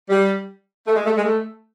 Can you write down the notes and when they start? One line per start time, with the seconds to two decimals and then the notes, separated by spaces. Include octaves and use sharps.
0.09 G3
0.86 A3
0.96 G#3
1.05 A3
1.16 G#3
1.25 A3